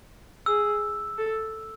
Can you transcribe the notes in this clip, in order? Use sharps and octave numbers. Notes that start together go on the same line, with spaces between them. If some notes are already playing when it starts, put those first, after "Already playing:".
G#4 E6
A4